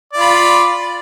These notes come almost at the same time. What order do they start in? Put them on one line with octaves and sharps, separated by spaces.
D5 F4 B5